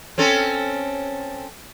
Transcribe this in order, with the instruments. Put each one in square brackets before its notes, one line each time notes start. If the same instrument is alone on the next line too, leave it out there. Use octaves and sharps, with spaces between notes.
[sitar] C4 C#4 A4